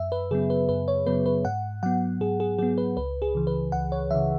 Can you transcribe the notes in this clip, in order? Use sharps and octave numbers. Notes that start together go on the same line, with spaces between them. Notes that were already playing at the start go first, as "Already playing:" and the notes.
Already playing: F#2 E5
B4
C#3 F#3 B3 G#4
B4
F#2 B4
C#5
C#3 F#3 B3 B4
B4
G#2 F#5
F#3 B3 F#5
G#2 G#4
G#4
F#3 B3 G#4
B4
C#2 B4
G#4
C#3 E3
B4
C#2 F#5
C#5
C#3 E3 E5